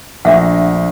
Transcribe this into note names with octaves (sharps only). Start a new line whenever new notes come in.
A#1 A3 D4 E5 F#5